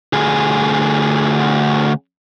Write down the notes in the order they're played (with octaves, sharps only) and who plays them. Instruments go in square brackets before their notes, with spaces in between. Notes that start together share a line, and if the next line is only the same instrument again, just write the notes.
[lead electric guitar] D2 G#4